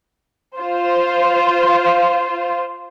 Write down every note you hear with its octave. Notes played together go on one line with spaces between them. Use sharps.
F4 C5